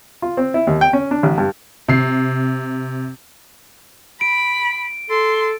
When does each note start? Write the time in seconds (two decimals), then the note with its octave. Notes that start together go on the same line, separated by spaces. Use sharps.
0.22 F4
0.37 C4
0.54 E4
0.67 D#2
0.81 G5
0.93 C#4
1.11 D4
1.23 A1
1.38 G2
1.89 C3 C7
4.21 B5 D7
5.10 A4 C6